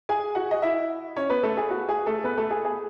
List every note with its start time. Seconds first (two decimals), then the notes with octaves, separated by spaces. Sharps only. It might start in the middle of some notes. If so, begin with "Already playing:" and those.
0.09 G#4 G#5
0.35 F#4 F#5
0.51 D#5
0.62 E4 E5
1.16 C#4 C#5
1.30 B3 B4
1.43 A3 A4
1.57 G#4
1.70 F#4
1.89 G#4
2.06 A3 A4
2.24 B3 B4
2.37 A3 A4
2.50 G#4
2.65 G#4